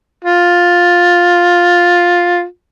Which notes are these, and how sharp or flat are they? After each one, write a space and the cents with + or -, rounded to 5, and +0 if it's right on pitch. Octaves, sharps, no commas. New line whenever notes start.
F4 +10